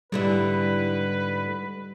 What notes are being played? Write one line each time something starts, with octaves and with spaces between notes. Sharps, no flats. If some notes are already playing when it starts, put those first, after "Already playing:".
G#2 D3 G3 E4 B4